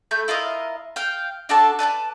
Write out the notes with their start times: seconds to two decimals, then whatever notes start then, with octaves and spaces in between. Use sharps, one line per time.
0.11 A3 B5 G6
0.28 E4 F4 A#4 D#5
0.96 F5 G5
1.49 D4 F#4 A4 A5
1.79 B4 D5 F#5 A5